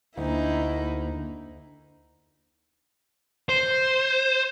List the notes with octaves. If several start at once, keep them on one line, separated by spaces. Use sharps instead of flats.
D2 A#3 D#4 E4
C5